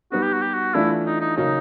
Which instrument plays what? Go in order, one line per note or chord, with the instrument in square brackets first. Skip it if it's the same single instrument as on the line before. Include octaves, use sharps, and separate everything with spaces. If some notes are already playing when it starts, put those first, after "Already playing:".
[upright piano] G3 B3 D#4 [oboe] F#4
[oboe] G4
F#4
G4
F#4
[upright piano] E3 A3 D4 F4 [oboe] E4
[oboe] D#4
D#4
[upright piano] C#3 F#3 A#3 C#4 [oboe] D#4